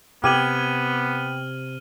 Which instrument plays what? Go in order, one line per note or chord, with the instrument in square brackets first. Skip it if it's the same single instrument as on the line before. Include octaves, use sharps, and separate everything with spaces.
[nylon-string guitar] C3 [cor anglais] B3 [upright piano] G5 D6 G#6 [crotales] F6 D#7 F#7